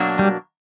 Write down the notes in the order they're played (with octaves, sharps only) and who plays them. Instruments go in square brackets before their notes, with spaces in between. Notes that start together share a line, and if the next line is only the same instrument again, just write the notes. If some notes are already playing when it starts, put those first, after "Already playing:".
Already playing: [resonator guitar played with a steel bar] B2 F#3 A#3 D4
[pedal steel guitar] G3